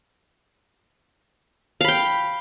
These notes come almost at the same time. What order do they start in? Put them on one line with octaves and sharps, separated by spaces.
F5 B5 G5